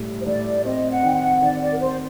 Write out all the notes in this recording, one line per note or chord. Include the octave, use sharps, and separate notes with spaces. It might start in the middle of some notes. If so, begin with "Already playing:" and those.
Already playing: A2 G3
C5
A2 D5
C4 D#5
F#5
D#3 G5
F#5
D#3 D5
D5
A#4
C4 C5